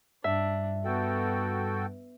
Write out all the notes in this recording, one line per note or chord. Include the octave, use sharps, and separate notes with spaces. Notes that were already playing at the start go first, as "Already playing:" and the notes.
G2 D4 E5
B3 F#4 A4 G5